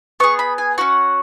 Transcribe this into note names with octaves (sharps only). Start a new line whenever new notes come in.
B3 G#4 C#6
B5
G#5
C#4 F#4 F#5